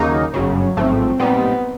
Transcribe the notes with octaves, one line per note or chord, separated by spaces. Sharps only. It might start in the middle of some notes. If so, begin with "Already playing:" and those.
Already playing: D#2 C#3 F#3 A#3 D#4
G1 F#2 C#3 F#3
A1 G#2 F3 A3 C4
A#2 G3 B3 C4 D#4